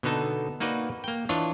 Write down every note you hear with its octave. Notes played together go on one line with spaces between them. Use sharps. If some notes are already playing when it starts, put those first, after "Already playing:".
B2 D3 B3 D#4 A4
A#3 D#4 F#4 B4 D5
A#3 G5
E3 D4 F4 C#5 D#5